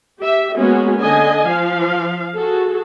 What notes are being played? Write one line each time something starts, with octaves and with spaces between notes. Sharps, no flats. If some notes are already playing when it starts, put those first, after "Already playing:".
G4 E5
G#3 A#3 B3 C#4 F#4
D3 D#5 G#5
F3 F5
F#4 G#4 A4